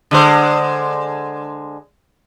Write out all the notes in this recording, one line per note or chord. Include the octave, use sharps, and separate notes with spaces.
D3 G#3 C5